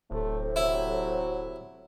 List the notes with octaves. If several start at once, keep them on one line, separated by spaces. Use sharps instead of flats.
D1 A2 C3 A3
F#3 E4